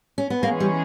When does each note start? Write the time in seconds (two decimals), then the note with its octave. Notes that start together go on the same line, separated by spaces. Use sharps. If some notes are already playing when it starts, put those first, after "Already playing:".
0.18 C#4
0.30 B3
0.43 E3 G#3 A#3 C#4 G#4
0.60 G3